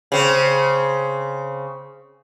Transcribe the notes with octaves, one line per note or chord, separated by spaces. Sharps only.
C#3 C4